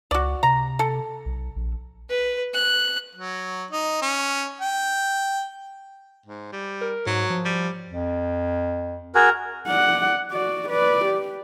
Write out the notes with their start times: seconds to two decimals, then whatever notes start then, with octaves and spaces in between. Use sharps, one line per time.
0.11 C#2 F#4 D5
0.43 C3 A#5
0.79 A4
1.26 B1
1.56 A#1
2.10 B4
2.54 F#6
3.15 F#3
3.71 D#4
4.02 C#4
4.60 G5
6.26 G#2
6.52 G3
6.81 A#4
7.07 G#2 F#3
7.30 F3
7.45 G3
7.90 F2
9.15 F#4 G#4 A#4
9.67 D5 F#5
10.31 F#4 D5
10.69 B4 D5
11.05 G4